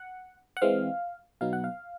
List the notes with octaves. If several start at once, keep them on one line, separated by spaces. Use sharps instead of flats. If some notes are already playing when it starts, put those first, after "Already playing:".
Already playing: F#5
F#5
E3 G#3 C4 F5
B2 F#3 B3 D#4 F5
F#5
F5